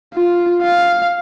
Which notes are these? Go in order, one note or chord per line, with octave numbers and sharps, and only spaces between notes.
F4
F5